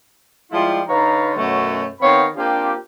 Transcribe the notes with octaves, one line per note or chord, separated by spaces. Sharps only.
F3 G3 G#3 E4 F4
D3 D#4 B4 C#5 F5 A#5
F#2 B2 F#3 A3 C#4 F#4
D#3 B3 C4 C#5 F5 B5
A#3 C4 D4 F4 G4